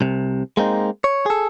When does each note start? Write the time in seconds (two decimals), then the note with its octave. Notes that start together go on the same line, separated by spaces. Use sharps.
0.01 C2 C3
0.57 G#3 A#3 C4 D#4
1.04 C#5
1.26 G#4 A4